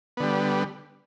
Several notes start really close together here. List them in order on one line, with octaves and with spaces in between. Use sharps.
B3 D3 G3